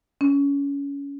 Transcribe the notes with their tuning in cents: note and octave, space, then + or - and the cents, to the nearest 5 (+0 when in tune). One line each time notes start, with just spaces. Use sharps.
C#4 +25